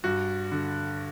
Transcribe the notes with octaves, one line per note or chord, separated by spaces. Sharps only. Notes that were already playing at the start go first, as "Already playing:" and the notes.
G2 F#4
D3